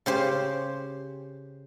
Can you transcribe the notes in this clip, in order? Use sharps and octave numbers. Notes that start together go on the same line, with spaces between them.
C#3 G4 C5